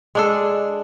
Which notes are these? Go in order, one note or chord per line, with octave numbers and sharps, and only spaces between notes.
G#3 D4 A4